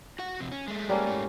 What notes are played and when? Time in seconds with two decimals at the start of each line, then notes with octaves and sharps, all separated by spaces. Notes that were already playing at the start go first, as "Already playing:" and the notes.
0.19 F#4 F#5
0.40 F2 C3
0.52 C#4
0.68 G#3 A3
0.89 G3 A#3 C#4
1.07 G#2 A3